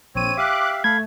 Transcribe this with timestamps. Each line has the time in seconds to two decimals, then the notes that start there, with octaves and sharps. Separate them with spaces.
0.15 A#1 C4 C#5 D#7
0.37 G4 E5 F5 D6 F#6
0.84 A3 A4 F5 B5 G#6